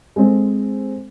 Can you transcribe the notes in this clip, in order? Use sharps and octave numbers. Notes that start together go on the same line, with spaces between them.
G#3 C4 A4